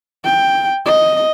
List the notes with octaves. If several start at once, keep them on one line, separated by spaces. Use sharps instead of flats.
G5
D#5